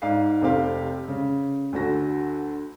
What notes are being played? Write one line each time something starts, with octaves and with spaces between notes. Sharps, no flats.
G#2 D5 F5 C7
F1 C3 C4 G4 F5
C#3
D2 D3 F#4 A#6